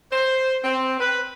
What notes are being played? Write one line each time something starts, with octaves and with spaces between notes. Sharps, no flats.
C5
C4
B4